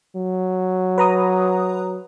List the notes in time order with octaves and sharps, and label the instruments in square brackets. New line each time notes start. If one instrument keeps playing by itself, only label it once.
[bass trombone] F#3
[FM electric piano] B4 A#5 D#6